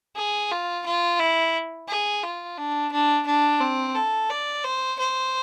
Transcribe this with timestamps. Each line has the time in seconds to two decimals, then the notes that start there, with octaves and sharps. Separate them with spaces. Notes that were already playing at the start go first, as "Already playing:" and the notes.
0.16 G#4
0.51 F4
0.86 F4
1.20 E4
1.88 G#4
2.23 F4
2.58 D4
2.92 D4
3.26 D4
3.61 C4
3.95 A4
4.30 D5
4.64 C5
4.98 C5